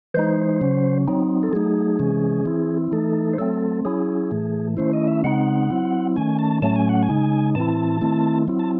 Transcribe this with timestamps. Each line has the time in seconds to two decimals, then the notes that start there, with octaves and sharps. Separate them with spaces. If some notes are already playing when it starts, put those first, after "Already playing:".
0.14 E3 G#3 D#4 C5
0.61 C#3 F#3 C#4
1.08 F#3 C4 D#4
1.43 A4
1.53 F#3 A3 D#4 G#4
1.99 C3 E3 G#3 C#4
2.45 E3 C4 E4
2.92 E3 A3 D#4 A4
3.33 C5
3.38 F#3 A3 C4 A4
3.85 F#3 C#4 E4 G#4
4.31 A2 E3 A3
4.77 D#3 A3 C#4 E4 C5
4.93 D#5
5.08 E5
5.24 C#3 G#3 C4 D#4 F#5
5.70 F#3 C4 E4
6.16 D#3 A3 C#4 G#5
6.39 A5
6.62 A2 F#3 A3 C#4 A5
6.76 G#5
6.89 F#5
7.03 G#5
7.09 C#3 G#3 D#4
7.55 A2 E3 C4 E4 A5
8.01 D#3 A3 C4 E4
8.48 F#3 C4 E4
8.59 A5